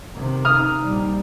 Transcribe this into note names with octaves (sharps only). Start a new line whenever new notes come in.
C3 D#3
D#4 D#6 F6
A#1 G3